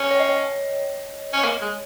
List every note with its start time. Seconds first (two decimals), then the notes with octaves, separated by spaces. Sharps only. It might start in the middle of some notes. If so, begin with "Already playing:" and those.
Already playing: C#4 C#5
0.11 C#5
0.20 D#5
0.29 C#5
1.33 C#4
1.44 A#3
1.61 G#3